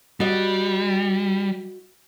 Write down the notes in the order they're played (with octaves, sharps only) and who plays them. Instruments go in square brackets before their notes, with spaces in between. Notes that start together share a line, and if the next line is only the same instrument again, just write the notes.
[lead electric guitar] G3 [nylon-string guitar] F#4 D#5